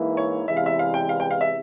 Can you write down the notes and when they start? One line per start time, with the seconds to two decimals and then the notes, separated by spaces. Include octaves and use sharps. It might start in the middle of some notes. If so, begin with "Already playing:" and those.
Already playing: G#2 E3 A#3 E4
0.17 C#5
0.48 E2 C3 E3 G#3 E5
0.57 F5
0.66 E5
0.79 F5
0.94 G5
1.09 F5
1.20 G5
1.31 F5
1.41 E5